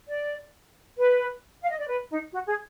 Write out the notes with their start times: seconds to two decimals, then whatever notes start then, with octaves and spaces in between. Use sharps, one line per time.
0.08 D5
0.98 B4
1.62 F5
1.70 D#5
1.79 D5
1.88 B4
2.11 D#4
2.34 F#4
2.48 G#4